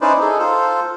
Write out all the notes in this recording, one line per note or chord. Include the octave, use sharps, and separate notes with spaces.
C#4 D#4 E4 B4 C5 D5
D#4 G#4 A4
F4 A4 C5